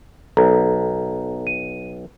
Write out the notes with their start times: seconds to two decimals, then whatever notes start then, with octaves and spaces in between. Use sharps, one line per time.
0.37 B1 A4 A#5
1.47 D#7